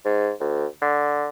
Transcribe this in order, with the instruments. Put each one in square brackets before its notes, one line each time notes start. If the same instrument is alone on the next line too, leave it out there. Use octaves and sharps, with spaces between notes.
[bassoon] G#2
D2
D3